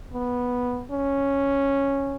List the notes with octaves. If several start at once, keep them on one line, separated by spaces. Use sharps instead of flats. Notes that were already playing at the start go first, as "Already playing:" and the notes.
B3
C#4